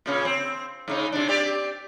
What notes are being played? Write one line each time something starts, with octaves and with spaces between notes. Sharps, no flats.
A#2 C#3 C#4
C4
G#2 C#3 D#4
C3 D4
C4 G4 D5